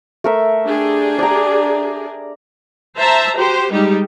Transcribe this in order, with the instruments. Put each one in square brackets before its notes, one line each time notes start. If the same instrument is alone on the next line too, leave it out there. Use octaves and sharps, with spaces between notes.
[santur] A3 A#4 E5
[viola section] D4 G4 G#4
[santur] D5 A#5
[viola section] C5 E5 A5 A#5
F#4 G4 C5
G3 G#3 D#4 G4